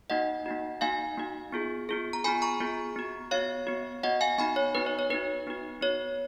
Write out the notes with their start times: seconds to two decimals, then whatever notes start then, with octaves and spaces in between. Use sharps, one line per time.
0.10 A#3 D#4 F#4 D#5 F#5
0.46 A#3 D#4 F#4
0.81 A#3 D#4 F#4 F5 G#5
1.17 A#3 D#4 F#4
1.52 B3 F4 G#4
1.89 B3 F4 G#4
2.13 A#5
2.24 B3 F4 G#4 G#5 B5
2.42 A#5 C#6
2.60 B3 F4 G#4
2.96 B3 F#4
3.31 B3 F#4 C#5 F5
3.67 B3 F#4
4.03 B3 F#4 D#5 F#5
4.21 F5 G#5
4.38 B3 D#4 F#4 G#5 B5
4.56 C#5
4.75 B3 D#4 F#4 B4
4.86 C#5
4.99 C#5
5.10 B3 D#4 F#4 B4
5.47 B3 D#4 F#4
5.81 B3 F#4 C#5